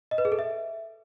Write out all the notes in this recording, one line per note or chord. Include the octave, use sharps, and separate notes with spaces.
D#5
B4
G#4
A4
E5